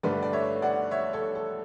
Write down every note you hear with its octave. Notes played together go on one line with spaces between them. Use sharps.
G1 G2 D3 A3 B4 D5
D5
C#5 E5
D5 F#5
C#5 E5
A4 C#5
A4